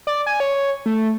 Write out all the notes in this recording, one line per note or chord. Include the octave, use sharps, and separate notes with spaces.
D5
G#5
C#5
A3